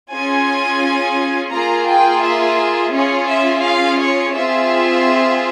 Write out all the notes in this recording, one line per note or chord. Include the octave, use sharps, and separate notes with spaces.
C#4 F4 G#4 G#5
A#3 F4 G#4 A#5
G5
E5
C#4 F4 G#4 C#5
E5
F5
C#5
C4 F4 G#4 E5